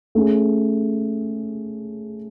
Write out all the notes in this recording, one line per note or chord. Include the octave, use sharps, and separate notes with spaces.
A3 C#4 G#4